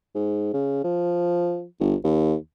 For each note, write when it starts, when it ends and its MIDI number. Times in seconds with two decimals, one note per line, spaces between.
0.15 0.50 44
0.53 0.84 49
0.84 1.65 53
1.80 1.95 31
2.04 2.35 39